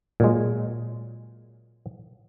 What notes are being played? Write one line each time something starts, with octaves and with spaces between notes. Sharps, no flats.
A#2 F#3 G#3